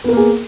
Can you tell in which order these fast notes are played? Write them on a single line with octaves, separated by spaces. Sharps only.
B3 A#4 A#3 G#4